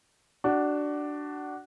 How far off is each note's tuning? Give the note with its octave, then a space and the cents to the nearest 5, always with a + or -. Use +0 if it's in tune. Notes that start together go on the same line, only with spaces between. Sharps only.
D4 +0 F#4 +20